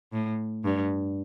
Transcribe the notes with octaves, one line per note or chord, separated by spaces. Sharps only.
A2
G2